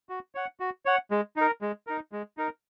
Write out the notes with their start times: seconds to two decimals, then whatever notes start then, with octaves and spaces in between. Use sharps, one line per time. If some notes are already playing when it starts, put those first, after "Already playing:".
0.09 F#4
0.35 C#5 F#5
0.60 F#4
0.86 C#5 F#5
1.11 G#3
1.36 D#4 A#4
1.62 G#3
1.87 D#4 A#4
2.12 G#3
2.37 D#4 A#4